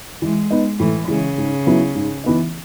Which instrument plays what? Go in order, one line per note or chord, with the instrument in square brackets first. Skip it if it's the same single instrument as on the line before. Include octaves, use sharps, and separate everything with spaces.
[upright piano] E3 [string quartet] G#3
[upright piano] B3 D#4
[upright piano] A2 [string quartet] E3
[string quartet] C#3 [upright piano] E3 G#3
[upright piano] G#2
F#3 B3 E4
G#2
E3 B3 D#4